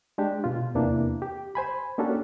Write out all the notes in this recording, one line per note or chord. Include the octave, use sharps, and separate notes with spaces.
G#3 D4 G4
B2 F4
E2 C3 E3 A#3 D4
G4
C5 G#5 B5
A#3 C#4 D4 F#4 G4 A4